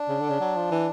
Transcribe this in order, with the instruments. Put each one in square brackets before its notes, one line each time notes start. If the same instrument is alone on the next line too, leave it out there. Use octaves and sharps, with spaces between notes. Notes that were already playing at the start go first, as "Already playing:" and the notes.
Already playing: [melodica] D4
[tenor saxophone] C#3
D3
C#3
F#3
F3
E3